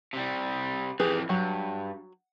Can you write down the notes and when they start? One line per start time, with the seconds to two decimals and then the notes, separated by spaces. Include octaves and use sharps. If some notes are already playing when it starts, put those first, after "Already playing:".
0.13 C3 G3
1.00 F2 E3 G4 G#4 B4
1.29 G2 F#3